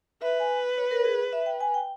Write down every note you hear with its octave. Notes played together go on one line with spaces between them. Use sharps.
B4 E5
G#5
C#5
A#4
G#4
E5
G5
G#5
G5